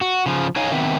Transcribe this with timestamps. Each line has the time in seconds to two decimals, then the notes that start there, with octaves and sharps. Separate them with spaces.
0.01 F#4
0.26 C#3 F3
0.56 D#4 C#5 D#5 F5 G#5
0.72 D#3 B3 C4 E5